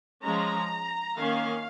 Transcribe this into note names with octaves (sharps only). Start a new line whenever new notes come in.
F3 G#3 C#4 A#5
D#3 A#3 C#4 F5